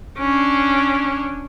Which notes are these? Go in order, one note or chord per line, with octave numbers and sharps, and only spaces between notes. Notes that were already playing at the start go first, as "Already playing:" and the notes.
C#4 D4